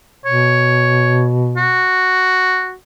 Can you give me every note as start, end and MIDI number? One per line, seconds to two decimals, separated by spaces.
0.26 1.82 47
0.26 1.25 73
1.57 2.74 66